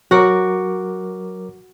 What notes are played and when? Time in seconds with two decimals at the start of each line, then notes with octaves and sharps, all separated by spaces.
0.11 F#3 F#4 A#4 F#5 D6